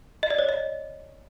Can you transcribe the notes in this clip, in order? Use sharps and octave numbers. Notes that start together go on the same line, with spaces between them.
D#5
D5
C#5
D#5